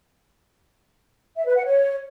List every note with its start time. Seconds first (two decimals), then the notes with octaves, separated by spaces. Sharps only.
1.36 E5
1.46 B4
1.55 F#5
1.65 C#5